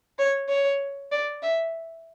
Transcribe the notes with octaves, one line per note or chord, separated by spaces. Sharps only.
C#5
C#5
D5
E5